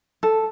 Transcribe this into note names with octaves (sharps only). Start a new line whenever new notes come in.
A4